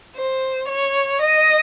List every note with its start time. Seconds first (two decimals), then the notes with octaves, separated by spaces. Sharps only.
0.16 C5
0.68 C#5
1.21 D#5